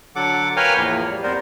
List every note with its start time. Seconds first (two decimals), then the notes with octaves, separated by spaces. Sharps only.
0.16 D3 F#3 A4 F#5 D6
0.56 A#4 B4 C#5 F5 G5 G#5
0.77 E2 A2 F3 A#3
1.10 G3
1.23 F2 G3 B3 A#4 C5